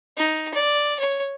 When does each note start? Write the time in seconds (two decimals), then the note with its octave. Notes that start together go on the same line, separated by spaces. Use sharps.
0.17 D#4
0.54 D5
1.00 C#5